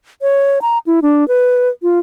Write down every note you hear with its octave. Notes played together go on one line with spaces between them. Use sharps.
C#5
A#5
E4
D4
B4
F4